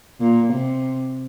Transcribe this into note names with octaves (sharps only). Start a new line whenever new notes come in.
A#2
C3